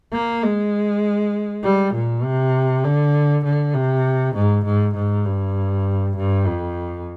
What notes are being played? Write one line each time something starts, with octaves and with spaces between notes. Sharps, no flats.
A#3
G#3
G3
A#2
C3
D3
D3
C3
G#2
G#2
G#2
G2
G2
F2